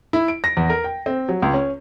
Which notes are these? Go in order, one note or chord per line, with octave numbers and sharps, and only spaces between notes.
E4
D7
A#6
E2
A#4
G5
C4
F#3
C#2
C#4